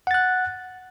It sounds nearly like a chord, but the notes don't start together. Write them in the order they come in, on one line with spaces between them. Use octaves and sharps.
F#5 A6 F#6